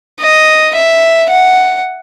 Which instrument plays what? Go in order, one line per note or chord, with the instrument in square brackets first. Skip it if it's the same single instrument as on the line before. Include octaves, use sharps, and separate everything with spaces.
[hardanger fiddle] D#5
E5
F#5